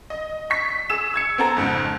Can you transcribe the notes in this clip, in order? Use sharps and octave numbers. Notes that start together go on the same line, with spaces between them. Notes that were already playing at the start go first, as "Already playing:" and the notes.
D#5
C#6 B6
G#4 E6 E7
E6 G#6 C#7
B3 C4 A4 A#5
F2 G#2 C#3